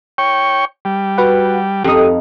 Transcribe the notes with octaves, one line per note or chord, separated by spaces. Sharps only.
C#5 G5 C#6
G3
F#4 B4 F#5
F2 D#4 G4 D#6